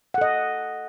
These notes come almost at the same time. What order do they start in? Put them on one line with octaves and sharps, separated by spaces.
F#5 A4 D#5